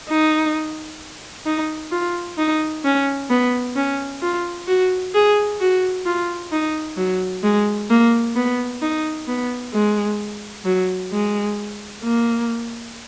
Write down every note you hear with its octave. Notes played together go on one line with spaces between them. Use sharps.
D#4
D#4
F4
D#4
C#4
B3
C#4
F4
F#4
G#4
F#4
F4
D#4
F#3
G#3
A#3
B3
D#4
B3
G#3
F#3
G#3
A#3